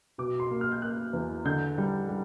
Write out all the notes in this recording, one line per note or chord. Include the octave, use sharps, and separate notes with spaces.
B2 D6
C6
A#3
F6
G6
A#3 F#6
E2
D3 G6
G3
G3